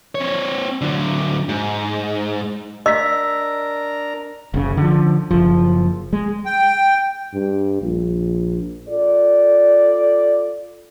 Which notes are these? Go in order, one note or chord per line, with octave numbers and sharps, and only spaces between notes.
C4 C#5
D3 F#3
G#2
D4 A#4 D#5 A#5 E6 B6
F#1 C#3
D3 F3
F#1 F3
G#3
G5
G2
A#1
F4 A4 D5